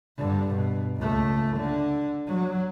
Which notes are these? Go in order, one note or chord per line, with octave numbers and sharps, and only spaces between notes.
G2 D3
B2
C#2 A3
D3
F#3